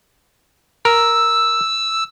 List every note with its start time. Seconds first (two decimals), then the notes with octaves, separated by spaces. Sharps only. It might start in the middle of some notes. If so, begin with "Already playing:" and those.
0.85 A#4 E6